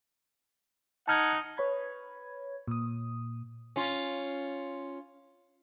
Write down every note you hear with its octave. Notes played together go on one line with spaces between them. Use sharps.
D#4 F#5 A5 F6 G#6
B4 C#5 B5 G#6
A#2 D#6
C#4 F4